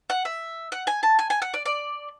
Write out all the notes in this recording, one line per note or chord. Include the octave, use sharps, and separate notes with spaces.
F#5
E5
F#5
G#5
A5
G#5
G#5
F#5
D5
D5